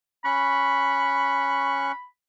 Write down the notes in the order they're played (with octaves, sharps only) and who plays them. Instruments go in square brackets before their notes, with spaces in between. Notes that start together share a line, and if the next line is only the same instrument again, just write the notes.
[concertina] C#4 C#6 F#6 [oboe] B5